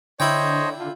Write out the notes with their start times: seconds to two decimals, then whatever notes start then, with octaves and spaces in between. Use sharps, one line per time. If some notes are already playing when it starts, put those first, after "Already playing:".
0.20 D3 E4 C5 C#5 D#5 G5
0.79 F4